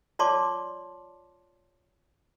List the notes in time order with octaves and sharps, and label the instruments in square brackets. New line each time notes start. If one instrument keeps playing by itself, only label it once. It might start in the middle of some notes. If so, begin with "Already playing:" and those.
[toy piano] F4 C#5 D5 A5 C6 D6